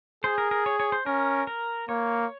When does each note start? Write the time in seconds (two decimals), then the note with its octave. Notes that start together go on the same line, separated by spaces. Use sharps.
0.24 G#4 C5
0.38 A#4
0.51 A#4
0.66 C#5
0.80 C#5
0.92 C5
1.06 C#4 A#4
1.47 A#4
1.89 A#3 C#5